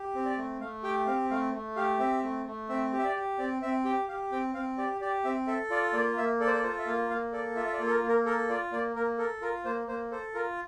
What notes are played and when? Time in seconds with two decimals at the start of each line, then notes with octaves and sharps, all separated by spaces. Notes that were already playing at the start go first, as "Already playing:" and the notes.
Already playing: G4
0.15 C4
0.25 D5
0.37 A3
0.61 A3 F5
0.83 G4 G5
1.07 C4 F5
1.30 A3 F5
1.53 A3
1.76 G4 F5
1.99 C4 E5
2.23 A3
2.46 A3
2.69 C4 E5
2.93 G4
2.99 E5
3.04 D5
3.16 G4
3.39 C4 D5
3.62 C4 E5
3.85 G4 G5
4.08 G4 F5
4.31 C4 G5
4.54 C4 F5
4.78 G4 D5
5.01 G4 D5
5.24 C4 E5
5.47 A4 E5
5.70 F4 D5
5.93 A#3 D5
6.17 A#3 E5
6.40 A4 D5
6.47 C5
6.54 D5
6.63 F4 C5
6.79 E5
6.86 A#3 F5
7.10 A#3 F5
7.33 A4 D5
7.56 F4 E5
7.66 E5
7.73 D5
7.80 A#3
7.87 A4
7.90 A#4
8.03 A#3
8.09 A#4
8.25 A4 A#4
8.49 F4 D5
8.72 A#3 D5
8.96 A#3 A#4
9.18 A4 A#4
9.41 F4 A#4
9.65 A#3 C5
9.87 A#3 C5
10.11 A4 C5
10.34 F4 A#4